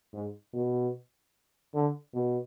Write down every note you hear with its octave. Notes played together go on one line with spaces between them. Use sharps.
G#2
B2
D3
B2